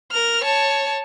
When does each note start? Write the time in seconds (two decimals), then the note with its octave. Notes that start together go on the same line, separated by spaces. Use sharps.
0.12 A#4 F6
0.44 C#5 A5